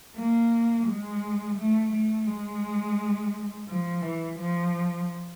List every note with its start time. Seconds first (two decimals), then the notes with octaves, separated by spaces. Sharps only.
0.17 A#3
0.87 G#3
1.57 A3
1.92 A3
2.27 G#3
3.68 F3
4.02 E3
4.38 F3